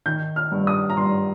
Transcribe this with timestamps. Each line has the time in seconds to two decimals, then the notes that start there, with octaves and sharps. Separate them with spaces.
0.06 D#3 G6
0.36 F6
0.52 G2
0.67 D#6
0.90 A#5
0.97 G2 C6